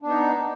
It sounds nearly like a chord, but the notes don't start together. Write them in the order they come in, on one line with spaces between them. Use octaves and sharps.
D4 B3 D#4